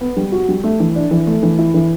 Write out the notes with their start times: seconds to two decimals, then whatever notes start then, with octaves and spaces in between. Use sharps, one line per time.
0.01 B3
0.17 G3
0.32 F#4
0.48 G3
0.64 A3
0.80 E3
0.95 D4
1.11 E3
1.27 A3
1.43 E3
1.59 E4
1.74 E3